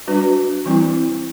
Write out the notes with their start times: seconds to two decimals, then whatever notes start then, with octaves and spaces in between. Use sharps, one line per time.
0.07 G3 D4 F#4 B4
0.66 E3 G3 C4 E4